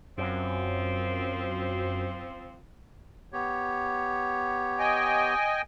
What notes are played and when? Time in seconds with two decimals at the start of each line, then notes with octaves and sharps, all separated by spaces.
0.17 F#2 F3 C4
3.32 B3 G4 C#5
4.79 D#5 G5 G#5